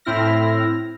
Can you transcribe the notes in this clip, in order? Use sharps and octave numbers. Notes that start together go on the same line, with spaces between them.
A2 C4 E4 F6 A#6